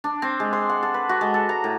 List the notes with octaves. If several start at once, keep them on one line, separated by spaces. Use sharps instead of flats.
D4
C4
G#3
C6
F#5
A4
B4
F#4
G#3
A4
A#5
A2